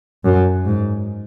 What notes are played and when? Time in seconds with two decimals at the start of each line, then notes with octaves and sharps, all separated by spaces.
0.25 F#2
0.66 G#2